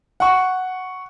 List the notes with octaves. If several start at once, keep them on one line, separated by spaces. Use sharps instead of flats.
F#5 C#6